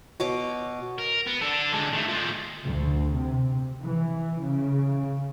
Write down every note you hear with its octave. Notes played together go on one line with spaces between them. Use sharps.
B2 C#5 D6
A#4
B3
D4 A4
D3 G#3
D#3 A3
F3 G#3
D2
C3
E3
C#3